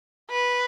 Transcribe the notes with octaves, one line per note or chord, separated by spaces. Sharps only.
B4